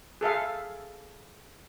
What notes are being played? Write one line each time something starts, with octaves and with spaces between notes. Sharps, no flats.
G#4 A4 E5 F5